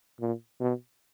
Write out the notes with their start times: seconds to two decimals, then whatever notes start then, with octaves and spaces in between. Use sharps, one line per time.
0.20 A#2
0.60 B2